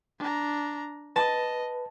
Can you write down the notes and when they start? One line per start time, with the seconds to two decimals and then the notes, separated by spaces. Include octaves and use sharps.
0.19 D4 A#5
1.16 B4 D#5 A5